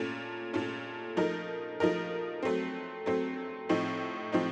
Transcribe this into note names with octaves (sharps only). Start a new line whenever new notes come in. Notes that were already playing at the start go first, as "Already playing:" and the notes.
Already playing: A#2 A3 C#4 A4
A#2 A3 C#4 A4
F3 A3 D#4 A#4
F3 A3 D#4 A#4
F#3 A3 C4
F#3 A3 C4
A2 F3 C4 D#4
A2 F3 C4 D#4